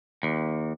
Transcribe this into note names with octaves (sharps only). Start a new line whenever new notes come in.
D#2